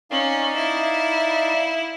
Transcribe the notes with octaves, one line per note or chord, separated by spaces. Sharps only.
C#4 D#4 D5 F5
E4